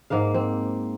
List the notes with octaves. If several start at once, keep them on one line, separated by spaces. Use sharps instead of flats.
G#2 A#3 A#4 F5
C4